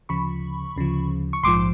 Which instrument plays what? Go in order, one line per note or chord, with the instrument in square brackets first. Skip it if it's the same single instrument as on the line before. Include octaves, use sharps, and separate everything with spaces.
[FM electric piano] D2 C#3 F3 B5 C#6
D2 C#3 F3
C#6
A#1 G#2 F3 C6 D6